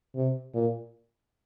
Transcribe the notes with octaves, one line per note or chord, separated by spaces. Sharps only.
C3
A#2